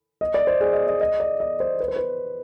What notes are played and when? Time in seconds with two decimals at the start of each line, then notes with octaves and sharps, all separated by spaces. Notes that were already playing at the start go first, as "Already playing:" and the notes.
0.21 D#5
0.34 D5
0.47 C5
0.61 G#4
0.73 D#5
0.87 D#5
1.01 D#5
1.20 D5
1.40 D#5
1.60 C5
1.80 B4
1.88 C5
1.96 B4